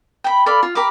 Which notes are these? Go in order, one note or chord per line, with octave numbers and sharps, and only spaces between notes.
G5 B5
A4 D5 F5 B5
F4
G4 A#4 B5 D6